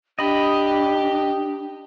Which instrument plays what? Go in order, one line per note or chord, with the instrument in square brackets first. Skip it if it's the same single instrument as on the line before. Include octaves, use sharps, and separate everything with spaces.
[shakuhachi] D4 [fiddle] G4 [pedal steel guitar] D#5 B5